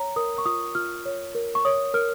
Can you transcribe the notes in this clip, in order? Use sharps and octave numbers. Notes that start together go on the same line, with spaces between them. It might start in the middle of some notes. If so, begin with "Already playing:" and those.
Already playing: C#5 A#5
A#4 D#6
C#6
F4 D#6
F4 F6
C#5
A#4
C#6
C#5 D#6
A#4 F6